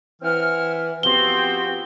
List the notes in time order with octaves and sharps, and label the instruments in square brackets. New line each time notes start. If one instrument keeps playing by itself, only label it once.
[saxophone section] E3 [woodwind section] C4 F#5 F6
[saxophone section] F3 F#4 G4 [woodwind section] B3 C4 [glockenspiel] G7